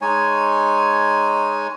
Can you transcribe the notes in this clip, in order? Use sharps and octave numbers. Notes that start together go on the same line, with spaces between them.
G#3 D#4 C#5 G#5